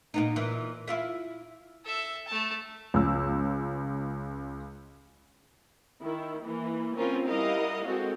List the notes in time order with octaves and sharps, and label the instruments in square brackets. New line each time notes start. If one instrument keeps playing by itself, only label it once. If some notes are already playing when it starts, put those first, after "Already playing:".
[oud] A#2 B3 D#4
A#2 E3
E4 F4 E5
[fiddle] A4 E5
A3 A5
[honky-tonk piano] C#2 E6
[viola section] D#3 E4
E3 A#3
C4 C#4 F4 A#4 B4
G3 E4 A#4 D#5 F5 F#5
G#3 C4 F#4 A4